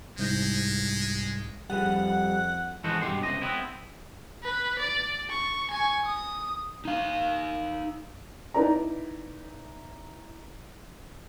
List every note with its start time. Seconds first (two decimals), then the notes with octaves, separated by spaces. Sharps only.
0.19 C2 G#2 G#3 G6
1.70 F2 G3 G#4 B4 F#5
2.84 E3 G#3 B3 F#4 A4 C5
3.02 G2 B2 D#3 G4 C6
3.23 C#2 C3 D#5
3.41 B3 C4 E4
4.43 B4
4.79 D5
5.30 C#6
5.71 G#5 C#6
6.06 D#6
6.85 D#4 F5
8.54 D#4 E4 B4 D5 A#5